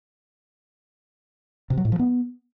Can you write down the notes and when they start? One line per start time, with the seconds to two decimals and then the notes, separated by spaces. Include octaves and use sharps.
1.70 C3
1.78 F#3
1.85 A2
1.92 F3
1.99 B3